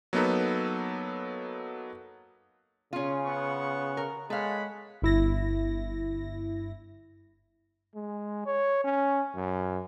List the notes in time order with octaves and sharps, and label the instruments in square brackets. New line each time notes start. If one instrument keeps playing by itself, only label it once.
[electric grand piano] F#3 A#3 B3 D#4 A4 B4
[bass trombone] C#3 [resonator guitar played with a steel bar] C#4 F4
[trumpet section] B3 F#5 C#6
[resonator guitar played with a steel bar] A#4
[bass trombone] G#3 [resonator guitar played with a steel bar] A4 F5 [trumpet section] C#5 F#5 B5
[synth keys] G1 E4 A#6
[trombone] G#3
C#5
C#4
F#2